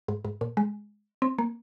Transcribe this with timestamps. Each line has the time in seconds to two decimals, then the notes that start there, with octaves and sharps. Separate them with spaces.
0.08 G#2
0.25 G#2
0.41 A#2
0.57 G#3
1.22 C4
1.39 A#3